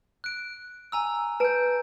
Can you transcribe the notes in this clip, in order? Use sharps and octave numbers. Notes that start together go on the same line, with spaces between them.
F#6 D7
G#5 A#5 E6
B4 A5 G6 D7